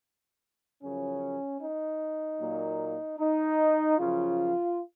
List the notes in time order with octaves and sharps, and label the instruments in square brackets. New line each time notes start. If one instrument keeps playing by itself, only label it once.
[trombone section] F#2 C#3 F3 C#4
D#4
A#2 F#3 A#3
D#4
F#2 C#3 F3 F4